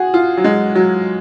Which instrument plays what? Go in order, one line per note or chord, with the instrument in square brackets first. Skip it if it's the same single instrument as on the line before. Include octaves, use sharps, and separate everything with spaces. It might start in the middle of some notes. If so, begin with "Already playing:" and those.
Already playing: [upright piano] F#4 G#4
F4
F#3
G#3
F#3